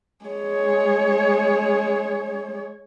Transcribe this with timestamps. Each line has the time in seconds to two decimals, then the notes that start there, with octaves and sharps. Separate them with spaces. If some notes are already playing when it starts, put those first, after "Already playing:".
0.25 G#3 C#5